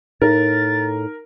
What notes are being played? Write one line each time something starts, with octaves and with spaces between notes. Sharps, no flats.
A2 D#4 A#4 A6